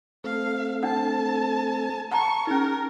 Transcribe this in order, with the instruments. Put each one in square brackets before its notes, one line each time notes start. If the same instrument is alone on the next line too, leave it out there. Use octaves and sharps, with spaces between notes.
[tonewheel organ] A3 C4 A4 [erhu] F5
[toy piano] D4 F#5 [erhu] A5
[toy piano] F#5 A5 A#5 [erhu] C#6
[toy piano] C#4 D#4 [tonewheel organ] G#4 [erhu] A#4